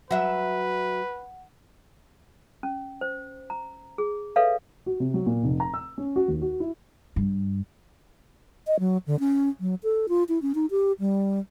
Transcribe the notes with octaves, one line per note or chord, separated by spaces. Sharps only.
F#3 B4 E5 F#5
C#4
C5
A#5
G#4
A4 B4 C#5 E5 F5
F#4
C3
F#3
A#2
F1
A#5
E6
C#4
F#4
D#2
F#4
E4
G2
D#5
F#3
D3
C#4
F#3
A4
F4
E4
C#4
D#4
G4
G3